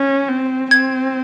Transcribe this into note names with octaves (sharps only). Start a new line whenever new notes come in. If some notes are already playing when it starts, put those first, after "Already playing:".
Already playing: C#4
C4
C4 G#6